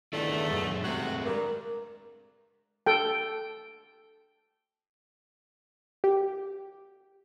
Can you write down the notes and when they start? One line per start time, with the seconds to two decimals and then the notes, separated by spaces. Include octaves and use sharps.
0.13 E2 A#2 D#3 A3 D4 E4
0.51 F#2 G#3
0.84 C3 G#3 A3 C4 F#4
1.25 G2 A#4
2.86 A4 G5
6.04 G4